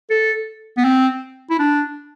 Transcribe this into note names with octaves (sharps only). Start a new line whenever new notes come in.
A4
B3
C4
E4
D4